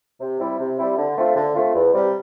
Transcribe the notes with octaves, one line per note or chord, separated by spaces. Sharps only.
C3
G3 C4 E4
C3
G3 C4 E4
D3
A3 C4 F4
D3
A3 C4 F4
E2
C3 G3